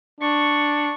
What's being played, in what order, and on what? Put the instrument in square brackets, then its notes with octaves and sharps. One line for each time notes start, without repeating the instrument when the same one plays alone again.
[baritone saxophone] D4 [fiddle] C#6